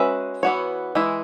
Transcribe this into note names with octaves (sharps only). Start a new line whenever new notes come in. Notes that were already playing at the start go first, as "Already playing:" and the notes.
Already playing: G#3 C#4 F#4 B4 E5
E3 B3 F#4 C#5
E3 G#3 E4